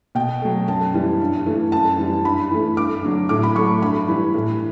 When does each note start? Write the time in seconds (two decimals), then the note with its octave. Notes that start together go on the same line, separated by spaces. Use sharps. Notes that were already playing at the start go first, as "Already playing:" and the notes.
0.15 B2 G5
0.42 F#3 A3
0.68 F#2 A5
0.94 E3 G3
1.21 G2
1.46 E3 A3
1.72 F#2 A5
1.98 E3 G3
2.24 G2 B5
2.51 E3 A3
2.77 G2 D6
3.03 D3 F#3
3.29 A2 D6
3.43 B5
3.56 F#3 A3 C#6
3.82 G2 B5
4.08 E3 G3
4.34 A2